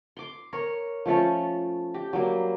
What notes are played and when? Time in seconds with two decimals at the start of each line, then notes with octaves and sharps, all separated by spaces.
0.17 C6 D6
0.53 A#4 C#5
1.05 F3 A3 C#4 A4
1.94 G4
2.13 F#3 G3 A#3